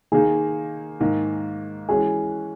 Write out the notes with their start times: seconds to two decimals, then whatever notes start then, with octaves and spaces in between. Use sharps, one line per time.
0.12 D#3 A#3 D#4 G#4
1.00 G#2 D#3 A#3
1.89 E3 G#3 C#4 F#4 G#4